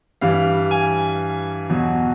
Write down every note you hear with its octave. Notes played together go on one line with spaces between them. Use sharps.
G2 E3 G3 F5
G#5
E2 B2 F#3